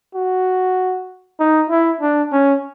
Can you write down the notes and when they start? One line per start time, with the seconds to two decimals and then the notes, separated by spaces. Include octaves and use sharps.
0.15 F#4
1.40 D#4
1.70 E4
2.01 D4
2.32 C#4